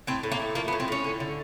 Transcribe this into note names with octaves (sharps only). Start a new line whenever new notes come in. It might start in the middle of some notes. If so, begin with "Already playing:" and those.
A2 C4
A2
A#3
A3
F3 A#3
B3
A2
C4
A2 C#4
D3
D3